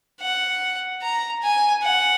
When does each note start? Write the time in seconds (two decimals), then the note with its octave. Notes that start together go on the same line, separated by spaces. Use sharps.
0.21 F#5
1.02 A#5
1.42 G#5
1.83 F#5